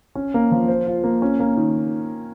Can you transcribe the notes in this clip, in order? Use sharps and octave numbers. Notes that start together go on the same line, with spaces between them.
C#4
A#3
F3
C5
F4
A#3
C#4
A#3
D#3